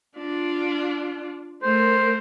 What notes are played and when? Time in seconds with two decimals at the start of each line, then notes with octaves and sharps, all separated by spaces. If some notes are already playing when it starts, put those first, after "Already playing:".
0.17 D4 F4
1.62 A3 A#4 C5